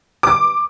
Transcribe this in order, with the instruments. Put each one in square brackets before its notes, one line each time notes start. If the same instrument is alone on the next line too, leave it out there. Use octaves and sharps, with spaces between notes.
[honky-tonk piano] D6